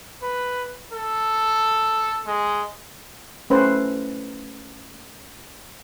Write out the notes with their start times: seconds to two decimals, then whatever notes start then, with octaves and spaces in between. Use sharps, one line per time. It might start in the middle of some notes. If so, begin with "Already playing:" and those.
0.22 B4
0.92 A4
2.26 G#3
3.50 A3 C#4 B4 C5